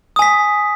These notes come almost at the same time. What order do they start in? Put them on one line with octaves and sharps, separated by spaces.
D#6 G#5 B6